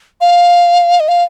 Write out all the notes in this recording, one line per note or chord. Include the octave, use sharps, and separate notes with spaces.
F5
D#5
F5